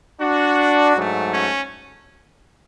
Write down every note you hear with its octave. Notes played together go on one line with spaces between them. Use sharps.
D4 F#4
G#2 F#3 A3
C#4